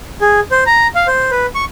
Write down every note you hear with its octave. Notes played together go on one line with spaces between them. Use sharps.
G#4
C5
A#5
F5
C5
B4
C#6